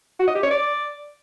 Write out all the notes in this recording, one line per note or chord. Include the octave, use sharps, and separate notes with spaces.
F#4
D#5
G4
C#5
D5